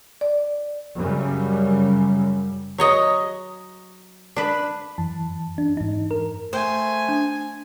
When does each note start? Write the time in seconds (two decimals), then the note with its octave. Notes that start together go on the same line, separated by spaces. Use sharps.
0.21 D5
0.96 F#2 C#3 G3
2.78 F#3 C#5 D#5
4.36 D4 B4
4.98 F#2 E3 A5
5.58 D4
5.77 G#2 D#4
6.11 A#4
6.53 A3 C5 G#5
7.09 D4